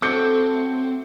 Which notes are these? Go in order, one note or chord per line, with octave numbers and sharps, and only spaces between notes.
F#3 A3 C4 A4 D6 G6 C#7